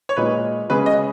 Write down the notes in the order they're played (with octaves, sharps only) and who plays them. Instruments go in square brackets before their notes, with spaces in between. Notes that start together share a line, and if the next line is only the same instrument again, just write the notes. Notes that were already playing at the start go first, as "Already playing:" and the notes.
[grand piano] C#5
[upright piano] A#2 G#3 D#4 [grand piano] B4
[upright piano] C#3 G#3 C#4 G#4 [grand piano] B4
[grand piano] D#5